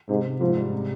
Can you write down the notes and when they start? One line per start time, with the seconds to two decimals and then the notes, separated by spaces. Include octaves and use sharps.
0.09 G#2 C3
0.25 C3
0.41 G#2 F3
0.57 G3
0.73 C3